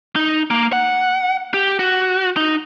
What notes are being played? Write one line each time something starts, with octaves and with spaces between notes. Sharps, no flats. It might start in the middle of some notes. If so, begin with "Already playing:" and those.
D#4
A#3
F#5
G4
F#4
D#4